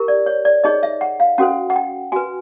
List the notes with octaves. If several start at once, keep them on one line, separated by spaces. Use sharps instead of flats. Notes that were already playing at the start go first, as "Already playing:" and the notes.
Already playing: E4 G4 A#4
D5
C#5
D5
D#4 G#4 C#5 D#5
E5
F#5
F5
C#4 F#4 A4 C5 F#5
F#5
G5
F#4 B4 G#5